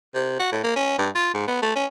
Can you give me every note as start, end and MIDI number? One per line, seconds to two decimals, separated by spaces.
0.15 0.36 48
0.39 0.51 66
0.52 0.59 45
0.64 0.75 58
0.76 0.94 61
0.98 1.09 43
1.15 1.30 65
1.34 1.45 44
1.48 1.62 59
1.62 1.73 57
1.75 1.86 61